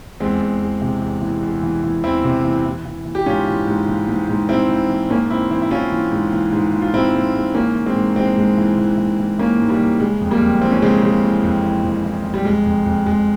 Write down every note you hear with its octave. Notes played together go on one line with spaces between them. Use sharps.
E2 G#3 C4
E2
E2
C3
E2
E3
E2
E3
E3
E2 C4 E4
C3
E3
E3
E3
E3
G4
G#2 C#4 F4
E3
G#2
E3
G#2
G#2
G#2 C4 E4
E3
E3
G#2 A#3 C#4
E3 C4 E4
E3 C4 E4
E4
E3 C#4 F4
E3
G#2
E3
G#2
E3
F4
G#2 C4 E4
G#2
G#2
E3 A#3 C#4
E3
G#3 C4
G#2
E3 G#3 C4
G#2
E3
E3
E3
E3
E3 A#3 C#4
G#2
G3 A#3
E3
C#3 G#3
F2
G3 A#3
F2
E3 C4
C#4
C#3 G#3 C4
C#3
E3
F2
E3
F2
E3
E3
G3
F2 G#3
F2
F2
F2 G#3